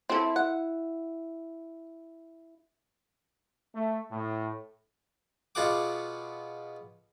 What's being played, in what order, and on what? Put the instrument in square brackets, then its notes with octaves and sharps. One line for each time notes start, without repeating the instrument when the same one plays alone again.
[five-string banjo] C4 A4 [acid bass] E4
[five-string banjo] F#5
[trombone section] A3
A2
[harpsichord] B2 F4 G#4 F#5 D6